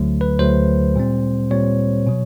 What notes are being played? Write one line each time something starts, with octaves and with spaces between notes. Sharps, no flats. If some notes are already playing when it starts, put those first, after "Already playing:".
Already playing: D2 D3 F#3 A3
B4
D2 D3 F#3 A3 C5
A#2 G3 C4
A#2 G3 C4 C#5
B2 F#3